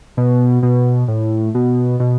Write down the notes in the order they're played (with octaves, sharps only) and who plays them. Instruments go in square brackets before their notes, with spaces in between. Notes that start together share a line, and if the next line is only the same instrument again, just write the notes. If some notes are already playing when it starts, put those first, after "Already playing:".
[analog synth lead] B2
B2
A2
B2
B2